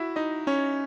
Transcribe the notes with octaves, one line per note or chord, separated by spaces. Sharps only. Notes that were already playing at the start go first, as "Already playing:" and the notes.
Already playing: E4 F#4 E5
D#4 D#5
C#4 C#5